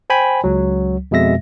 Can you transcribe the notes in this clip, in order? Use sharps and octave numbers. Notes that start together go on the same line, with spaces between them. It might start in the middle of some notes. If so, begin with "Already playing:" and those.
C5 G5 G#5 B5
C#2 F#3
F2 B2 G#3 E5 A#6